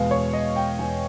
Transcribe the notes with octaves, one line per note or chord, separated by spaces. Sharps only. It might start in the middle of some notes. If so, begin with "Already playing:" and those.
Already playing: E2 B2 G#3 B3 F5
C#5
D#5
G5
E2 B2 G#3 B3 G#5